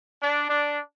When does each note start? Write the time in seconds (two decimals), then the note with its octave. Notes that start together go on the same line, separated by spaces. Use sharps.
0.21 D4
0.49 D4